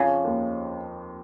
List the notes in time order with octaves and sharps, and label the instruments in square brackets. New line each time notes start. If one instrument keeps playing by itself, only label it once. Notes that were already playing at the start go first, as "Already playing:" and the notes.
Already playing: [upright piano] F2 F3 [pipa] C#3
[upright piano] D#2